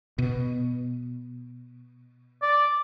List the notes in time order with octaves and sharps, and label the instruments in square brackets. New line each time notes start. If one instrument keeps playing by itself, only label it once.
[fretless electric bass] B2
[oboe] D5